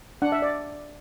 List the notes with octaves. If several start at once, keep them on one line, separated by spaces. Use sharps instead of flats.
D4 F#5
E5
D5